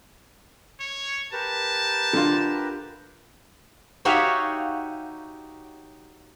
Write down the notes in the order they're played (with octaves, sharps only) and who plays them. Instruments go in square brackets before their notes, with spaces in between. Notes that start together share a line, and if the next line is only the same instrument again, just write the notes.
[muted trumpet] C#5
[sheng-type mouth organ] G4 A#4 B4 [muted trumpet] A5
[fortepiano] D3 F4
[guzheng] D#4 F#4 G4 C#5 E5 F5